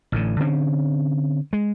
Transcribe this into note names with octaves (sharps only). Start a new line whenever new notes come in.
A1 A2 D3
D3 C4 C#4
G#3